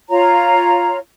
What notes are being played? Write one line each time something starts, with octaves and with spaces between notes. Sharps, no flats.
F4 C#5 A#5